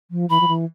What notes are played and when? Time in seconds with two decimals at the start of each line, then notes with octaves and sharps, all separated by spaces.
0.11 F3
0.30 E3 B5
0.41 F3
0.48 E3